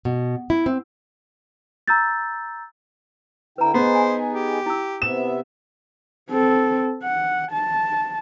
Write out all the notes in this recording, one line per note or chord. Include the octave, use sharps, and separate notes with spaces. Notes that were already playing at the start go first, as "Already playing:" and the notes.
B2
E4
C4
A#5 E6 G6 A6
D3 E4 B4 G5 A#5
B3 D#4 G#4 C5
G#5
G4
E4 E6
C3 B3 E5 E7
C4 A4
F#5
A5